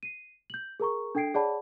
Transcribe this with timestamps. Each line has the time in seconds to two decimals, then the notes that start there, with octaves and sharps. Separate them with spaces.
0.03 C7 D#7
0.50 G6 F#7
0.80 G#4 A#4 A#5 C#6
1.15 D4 A4 G5 G#6 C7 D7
1.34 G#4 C#5 D5 F#5 A5 B5